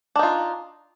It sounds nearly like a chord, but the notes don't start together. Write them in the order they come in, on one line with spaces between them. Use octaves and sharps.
D4 D#4 F4